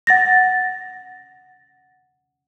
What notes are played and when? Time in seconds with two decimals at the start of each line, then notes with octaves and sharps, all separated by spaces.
0.07 F#5 A6 A#6